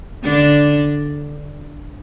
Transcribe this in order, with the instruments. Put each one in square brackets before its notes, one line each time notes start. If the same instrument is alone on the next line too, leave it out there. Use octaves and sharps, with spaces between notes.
[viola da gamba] D3 D4